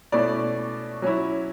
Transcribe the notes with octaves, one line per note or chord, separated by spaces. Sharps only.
B2 A3 C#4 E4 D5
F#3 C#4 E4